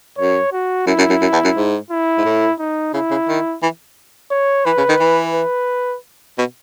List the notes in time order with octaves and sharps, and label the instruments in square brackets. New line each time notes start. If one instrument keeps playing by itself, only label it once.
[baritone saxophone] F#2 [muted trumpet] C#5
[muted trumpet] F#4
[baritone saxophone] F#2 [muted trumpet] E4
[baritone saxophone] F#2
F#2
F#2
E2
F#2
G#2
[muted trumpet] E4
[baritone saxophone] G#2
A2
[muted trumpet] D#4
[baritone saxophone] C#3 [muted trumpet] E4
[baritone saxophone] C#3
D#3
E3
[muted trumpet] C#5
[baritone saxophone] E3 [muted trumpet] B4
[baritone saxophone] C#3
D#3
E3
[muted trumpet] B4
[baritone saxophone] B2